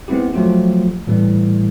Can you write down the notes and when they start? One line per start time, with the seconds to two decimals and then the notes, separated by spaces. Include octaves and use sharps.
0.08 G#3 B3 C4 E4 G4
0.33 F3 F#3 A3 F4 G4
1.07 A2 E3 G3 A3